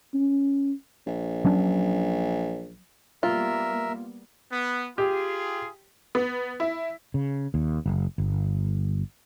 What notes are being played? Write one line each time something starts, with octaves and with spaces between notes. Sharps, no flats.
C#4
A#1
F#3 C#4 D4
G3 A#3 B3 F4 A#4 E5
B3
F4 G4 G#4
B3
E4
C#3
D#2
F#1
G1